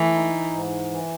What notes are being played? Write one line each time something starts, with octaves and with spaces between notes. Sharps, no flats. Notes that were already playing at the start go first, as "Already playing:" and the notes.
Already playing: E3 A3
D#4
G#2
E3